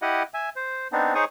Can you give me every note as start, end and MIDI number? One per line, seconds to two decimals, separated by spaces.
0.02 0.23 64
0.02 0.23 67
0.02 0.23 75
0.02 0.23 78
0.34 0.49 76
0.34 0.49 80
0.56 0.88 72
0.92 1.14 59
0.92 1.14 60
0.92 1.14 62
0.92 1.14 63
1.15 1.25 63
1.15 1.25 68
1.15 1.25 72
1.15 1.25 73
1.15 1.25 85
1.15 1.25 87